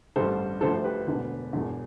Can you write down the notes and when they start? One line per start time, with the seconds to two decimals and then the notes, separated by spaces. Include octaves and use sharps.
0.16 A1 G2 D3 G3 A4 C5
0.61 D2 D3 F3 A3 A4 C5
0.74 C5
0.84 G4 B4
1.07 E1 D2 D3
1.53 E1 E2 D3